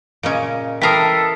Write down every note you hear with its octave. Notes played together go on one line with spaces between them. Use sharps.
A#2 C#3 C#4 D#5 D7
E3 A4 A#4 G5 A5 D#6 B6 C7